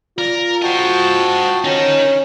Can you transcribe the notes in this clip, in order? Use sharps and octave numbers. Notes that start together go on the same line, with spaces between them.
F4 A#4 D5
F#4 C5 D#5 G5 A5
C#4 D#4 A#4